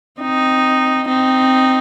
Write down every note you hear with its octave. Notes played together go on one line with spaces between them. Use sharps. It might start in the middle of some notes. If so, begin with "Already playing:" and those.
C4 D#4
C4 D#4